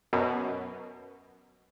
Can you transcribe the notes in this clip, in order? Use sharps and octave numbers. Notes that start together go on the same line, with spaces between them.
F#2 B2